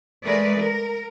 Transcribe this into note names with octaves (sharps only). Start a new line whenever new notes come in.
G#3 A3 A#4 B4 D5
A#4